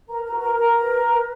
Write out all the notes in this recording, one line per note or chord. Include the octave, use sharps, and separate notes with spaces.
A#4 B4 A#5
A#4 A#5
F#4
A#4 A#5
F#4 A#4 A#5
B4
B4